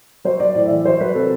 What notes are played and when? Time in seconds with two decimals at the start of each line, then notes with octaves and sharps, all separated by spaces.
0.25 F#3 C5
0.40 F#3 D5
0.55 A2 D5
0.66 E5
0.70 E3
0.85 F#3 C5
1.00 F#3 B4
1.15 C3 A4